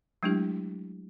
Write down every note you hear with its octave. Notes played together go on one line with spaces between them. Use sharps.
F#3 G#3 A3 D4 E4 G4